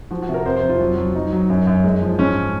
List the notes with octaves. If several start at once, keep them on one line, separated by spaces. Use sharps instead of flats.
F3 F#4
F#4
C3
A#4
F2 C5
C5
F2
F4
F#3
F#3
F#3 D#4
F#3
F#2
F#2
G#3
F3
G#2 C#4